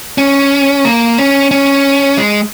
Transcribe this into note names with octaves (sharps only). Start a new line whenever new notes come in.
C#4
A#3
C#4
C#4
G#3